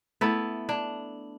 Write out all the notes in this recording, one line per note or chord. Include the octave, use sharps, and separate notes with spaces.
A3 B3 E4
D4